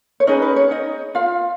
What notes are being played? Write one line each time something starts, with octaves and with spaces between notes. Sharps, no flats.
C#5
C#4 D#4 G#4 B4 D#5
B4
C#5
D#4 D#5
F4 F5